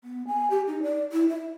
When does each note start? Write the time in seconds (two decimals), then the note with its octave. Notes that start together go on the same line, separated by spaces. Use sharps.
0.04 B3
0.27 G#5
0.50 G4
0.67 D#4
0.83 D5
1.12 E4
1.29 E5